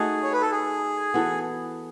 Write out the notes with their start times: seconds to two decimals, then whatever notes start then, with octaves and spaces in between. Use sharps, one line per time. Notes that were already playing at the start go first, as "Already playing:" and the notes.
Already playing: A3 D#4 F#4 G#4
0.23 C#5
0.33 B4
0.42 A4
0.51 G#4
1.14 E3 B3 F#4 A4